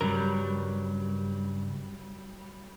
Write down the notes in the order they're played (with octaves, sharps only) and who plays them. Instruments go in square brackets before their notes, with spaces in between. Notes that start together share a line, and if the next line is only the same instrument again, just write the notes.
[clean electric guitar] G2 C#3 A#4 [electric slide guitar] F#3 G3